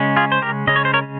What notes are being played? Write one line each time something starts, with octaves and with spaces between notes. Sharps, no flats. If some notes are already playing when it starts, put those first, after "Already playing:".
Already playing: C#3 G#3 C#4
F4 G#4
C5
G4 A#4
C#3 G#3 C#4 D#5
C#5
C5
A#4 C#5